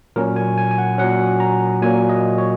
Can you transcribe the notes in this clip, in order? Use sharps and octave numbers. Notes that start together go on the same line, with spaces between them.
A#2 F#3 C#4 A#4
G#5
G#5
G#5
F#5
A#2 F#3 C#4 F#5
A#5
A#2 F#3 A#3 G#5
D#5
C#5